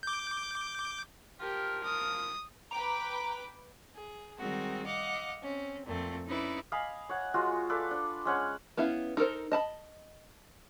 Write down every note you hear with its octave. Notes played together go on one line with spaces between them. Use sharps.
D6 G6
F3 F4 G4 A#4
D#6
B4 G5 A#5 D6
G#4
D#3 G3 G#3 C4 F#4 A#4
D#5 F5 F#5 D6
C4 C#4
F2 A#2 A3 C4
C#4 D#4 E4 B4 D5
D#5 F5 G#5 B5
C#5 F#5
G#3 F4 F#4
A4 B4 D5 F5
D4
G#3 C#4 F#5
B3 C#4 E4 F5
D#4 A4 A#4 C5
D#5 A5 B5